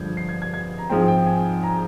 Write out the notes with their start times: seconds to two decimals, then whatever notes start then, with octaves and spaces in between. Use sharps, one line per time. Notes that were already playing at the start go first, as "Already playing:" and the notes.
Already playing: G2 D3 F3 G#3 G6 G#6
0.17 C7
0.29 G#6
0.42 G#6
0.54 G#6
0.78 A#5
0.89 G#2 F3 G#3 C4 G5
1.08 G5
1.27 G#5
1.63 A#5